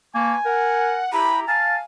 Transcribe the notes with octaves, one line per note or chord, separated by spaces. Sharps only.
A#3 B4 G#5 A5 C#6
A#4 F#5
E4 G4 A#5 B5
F5 G#5 A5